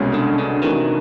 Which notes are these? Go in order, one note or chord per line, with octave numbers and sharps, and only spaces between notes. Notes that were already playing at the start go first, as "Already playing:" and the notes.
Already playing: C2 B2 G#3 C#4
D3
D3
C3 D#3 E3 A3 D4 F#4